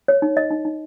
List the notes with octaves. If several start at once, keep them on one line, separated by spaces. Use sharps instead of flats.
C#5
D#4
D#5
D#4
D#4